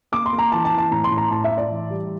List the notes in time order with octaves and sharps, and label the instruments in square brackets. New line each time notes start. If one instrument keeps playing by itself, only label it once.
[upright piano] A#3 D6
C6
A#3
A#5
E3 A5
A5
E3
A5
A2 A#5
C6
A2
A#5
A2 A5
E5
A2
D5
E3
G3